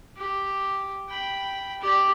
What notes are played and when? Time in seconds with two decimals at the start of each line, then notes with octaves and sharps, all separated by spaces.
0.16 G4
1.09 G5 B5
1.81 G4 D5